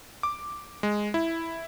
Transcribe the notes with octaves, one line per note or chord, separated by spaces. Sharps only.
D6
G#3
E4